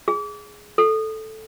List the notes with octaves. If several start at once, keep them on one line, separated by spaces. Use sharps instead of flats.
G#4
A4